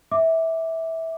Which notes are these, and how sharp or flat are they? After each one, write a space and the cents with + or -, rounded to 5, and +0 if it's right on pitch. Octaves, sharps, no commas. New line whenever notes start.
E5 -20 D6 +0